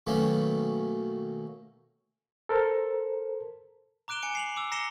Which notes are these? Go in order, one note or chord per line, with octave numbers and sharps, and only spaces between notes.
B2 D#3 F#3 A3 A#3 C#4
A4 A#4 C5
A#5 D6 F#6 D7 E7 G7
G#5 C#7 D7
C7 F7 F#7
D6 E6
A#5 A#6 C7 C#7 E7 G7